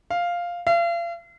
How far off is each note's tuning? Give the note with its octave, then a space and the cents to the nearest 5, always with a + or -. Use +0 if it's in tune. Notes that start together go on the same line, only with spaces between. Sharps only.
F5 +0
F5 -40